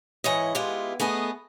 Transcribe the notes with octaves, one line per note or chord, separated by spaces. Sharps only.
G#2 E3 E4 C#5 D#5
G#3 B3 E4 F4 G4
A3 B3 G#4 D#5